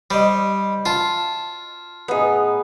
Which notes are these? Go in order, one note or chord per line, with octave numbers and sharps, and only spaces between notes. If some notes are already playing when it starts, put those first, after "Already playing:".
G3 C5 D#5
F4 A5
A2 B3 D#4 G#4